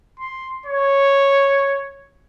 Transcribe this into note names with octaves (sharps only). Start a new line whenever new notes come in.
C6
C#5